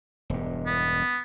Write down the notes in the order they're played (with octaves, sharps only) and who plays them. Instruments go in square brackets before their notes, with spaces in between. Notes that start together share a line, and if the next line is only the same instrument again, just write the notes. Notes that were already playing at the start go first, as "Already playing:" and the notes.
[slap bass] E1 G2
[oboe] B3